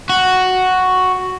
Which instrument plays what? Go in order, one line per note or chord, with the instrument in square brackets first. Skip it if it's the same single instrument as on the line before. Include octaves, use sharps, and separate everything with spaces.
[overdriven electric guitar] F#4